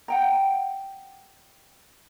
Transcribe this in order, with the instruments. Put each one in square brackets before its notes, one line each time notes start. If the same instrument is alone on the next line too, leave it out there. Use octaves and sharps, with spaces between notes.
[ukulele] F#5 G5 A#5